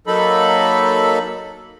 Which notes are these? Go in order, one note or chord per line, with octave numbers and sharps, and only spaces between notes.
F#3 A#3 D#4 A4 B5